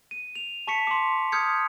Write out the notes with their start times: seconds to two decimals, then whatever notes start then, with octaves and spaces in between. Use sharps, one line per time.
0.11 D#7
0.35 F7
0.67 A5 C#6 B6 C#7
0.87 C6 D6
1.32 D#6 F6 G6 G#6 C#7